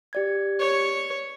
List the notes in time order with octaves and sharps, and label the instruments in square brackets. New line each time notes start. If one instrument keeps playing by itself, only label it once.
[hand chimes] G4 D5 G#6
[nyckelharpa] C#5